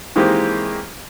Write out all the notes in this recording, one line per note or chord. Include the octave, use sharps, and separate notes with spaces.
D#3 E3 G#3 A#3 C4 G4